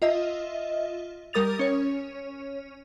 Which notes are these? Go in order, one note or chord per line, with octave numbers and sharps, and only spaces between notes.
F4 D#5 E5
G3 A#4 D#6 A6 F7
C#4 C#5